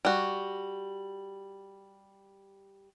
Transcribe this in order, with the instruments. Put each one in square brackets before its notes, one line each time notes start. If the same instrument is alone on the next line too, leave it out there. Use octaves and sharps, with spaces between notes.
[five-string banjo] G3 F#4